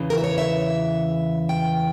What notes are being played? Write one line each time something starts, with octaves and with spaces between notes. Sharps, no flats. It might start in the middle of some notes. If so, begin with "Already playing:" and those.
Already playing: E2 C#3 E3
A#4
E5
C#5
E5
G5